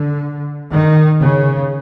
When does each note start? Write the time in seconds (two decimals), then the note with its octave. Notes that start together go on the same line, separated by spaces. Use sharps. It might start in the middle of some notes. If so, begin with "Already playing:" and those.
Already playing: D3
0.72 D#3
1.23 C#3